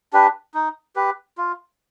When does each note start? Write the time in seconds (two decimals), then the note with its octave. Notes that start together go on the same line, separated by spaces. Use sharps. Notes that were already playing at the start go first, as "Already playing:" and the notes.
0.13 D4 G4 B4
0.54 D#4
0.96 G4 B4
1.38 F4